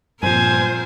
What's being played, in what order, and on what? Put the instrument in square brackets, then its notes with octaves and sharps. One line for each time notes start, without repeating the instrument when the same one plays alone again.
[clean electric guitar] G2 F3 [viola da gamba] A#2 C4 A#4 [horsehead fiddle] C5 [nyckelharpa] G#5